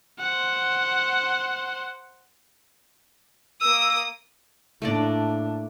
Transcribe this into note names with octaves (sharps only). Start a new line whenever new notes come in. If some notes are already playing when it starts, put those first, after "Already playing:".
C5 F#5
A#3 D#6 E6
A2 A3 A#3 D4 D5